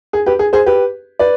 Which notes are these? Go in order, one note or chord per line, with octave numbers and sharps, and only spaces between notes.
G#4
G4 B4
G#4
G#4 C5
G4 B4
B4 D5